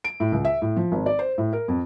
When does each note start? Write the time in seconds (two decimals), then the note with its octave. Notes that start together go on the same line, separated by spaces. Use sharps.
0.04 D7
0.20 A2
0.32 C#2
0.45 E5
0.62 A2
0.76 F3
0.92 G#1
1.06 D5
1.19 C5
1.38 A2
1.53 A#4
1.68 F2